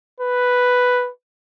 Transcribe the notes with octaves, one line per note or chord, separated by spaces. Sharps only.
B4